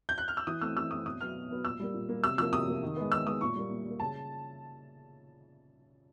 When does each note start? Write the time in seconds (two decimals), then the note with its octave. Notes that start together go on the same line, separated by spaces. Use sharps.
0.09 G6
0.18 F#6
0.28 F6
0.37 E6
0.47 E3 D#6
0.61 A3 C4 E6
0.77 E3 E6
0.91 A3 C4 D#6
1.06 B2 D#6
1.21 F#3 B3 F6
1.35 B2
1.50 F#3 B3
1.64 A#2 E6
1.80 G3 A#3
1.94 A#2
2.09 G3 A#3
2.24 C3 E6
2.38 F3 A#3 E6
2.53 C3 D#6
2.68 F3 A#3
2.83 D#3
2.96 G#3 B3
3.12 D#3 E6
3.26 G#3 B3 D#6
3.41 A#2 C#6
3.56 G3 A#3
3.70 A#2
3.85 G3
3.90 A#3
4.00 C#3 A5